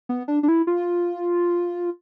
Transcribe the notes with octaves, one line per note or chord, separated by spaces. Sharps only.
B3
D4
D4
E4
F4